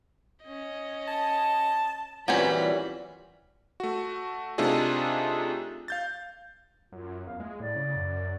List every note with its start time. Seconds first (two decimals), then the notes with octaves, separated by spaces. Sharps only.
0.44 C#4 D#5
1.08 A5
2.28 A#2 E3 F#3 G3 C4 C#4 B5 B6
3.80 A3 F#4
4.58 C3 A3 D4 D#4 F4 G#4
5.88 F5 G6 A6
6.92 F#2 F4
7.27 E2 F5
7.40 G#3 A3
7.60 A2 D5
7.75 C#3
7.96 F#2